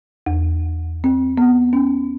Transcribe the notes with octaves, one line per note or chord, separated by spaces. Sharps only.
E2
C4
B3
C#4